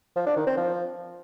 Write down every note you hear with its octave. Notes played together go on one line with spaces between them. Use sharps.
F3
D4
D#3
C4
F3